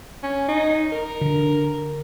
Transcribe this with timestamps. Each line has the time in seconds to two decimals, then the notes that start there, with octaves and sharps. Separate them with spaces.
0.23 C#4
0.48 D#4
0.92 A#4
1.21 D3